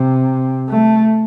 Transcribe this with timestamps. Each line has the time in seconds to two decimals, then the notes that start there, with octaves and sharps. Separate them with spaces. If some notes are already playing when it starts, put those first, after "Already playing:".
Already playing: C3
0.69 A3